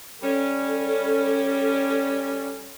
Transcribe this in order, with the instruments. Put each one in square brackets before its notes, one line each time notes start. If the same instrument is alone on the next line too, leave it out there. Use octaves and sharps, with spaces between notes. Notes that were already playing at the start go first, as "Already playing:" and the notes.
[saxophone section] G3 C#4 [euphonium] A4